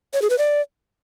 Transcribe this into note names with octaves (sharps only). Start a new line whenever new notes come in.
C#5
G#4
B4
D5